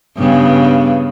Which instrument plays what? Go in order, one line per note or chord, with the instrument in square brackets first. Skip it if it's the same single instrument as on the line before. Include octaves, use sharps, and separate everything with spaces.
[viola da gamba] G2 C#3 B3